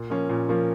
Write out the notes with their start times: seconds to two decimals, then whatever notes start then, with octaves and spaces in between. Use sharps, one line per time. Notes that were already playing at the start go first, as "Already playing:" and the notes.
Already playing: A#2
0.10 F3 A#3 C#4
0.29 A#2
0.49 F3 A#3 C#4